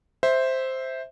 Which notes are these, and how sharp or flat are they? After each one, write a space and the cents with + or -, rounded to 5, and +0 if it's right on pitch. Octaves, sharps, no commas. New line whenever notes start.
C5 +0 E5 -10